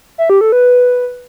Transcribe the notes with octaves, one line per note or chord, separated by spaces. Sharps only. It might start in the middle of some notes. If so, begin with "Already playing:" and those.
E5
G4
A4
B4